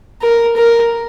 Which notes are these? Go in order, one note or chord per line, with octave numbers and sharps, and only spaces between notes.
A#4
A#4